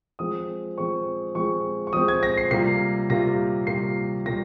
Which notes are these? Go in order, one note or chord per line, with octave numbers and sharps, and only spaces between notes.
F3 G#3 C4 D#6
F3 G#3 C4 C#6
F3 G#3 C4 C#6
C#6
F3 G#3 C4 D#6
G#6
A#6
C7
C3 G3 A#3 F4 C7
C3 G3 A#3 F4 A#6
C3 G3 A#3 F4 C7
C3 G3 A#3 F4 A#6